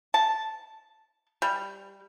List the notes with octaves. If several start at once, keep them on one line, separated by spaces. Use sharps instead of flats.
A5
G3